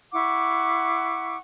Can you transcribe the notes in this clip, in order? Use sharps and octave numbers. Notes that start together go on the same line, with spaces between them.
E4 F#5 C#6 D6